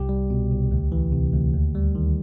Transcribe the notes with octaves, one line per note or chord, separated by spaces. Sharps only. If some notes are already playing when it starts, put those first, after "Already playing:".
Already playing: C2 G4
G3
B2
C2
D2
E3
C3
D2
D#2
G3
D#3